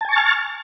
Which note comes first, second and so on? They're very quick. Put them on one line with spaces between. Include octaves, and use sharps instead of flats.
A5 G#5 C#6 A6 F6